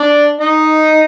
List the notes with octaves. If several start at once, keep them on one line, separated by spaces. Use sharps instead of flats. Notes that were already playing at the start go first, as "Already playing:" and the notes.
Already playing: D4 D5
D#4 D#5